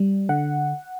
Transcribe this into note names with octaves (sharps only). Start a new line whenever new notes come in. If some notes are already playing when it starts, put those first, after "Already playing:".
Already playing: G3
D3 F#5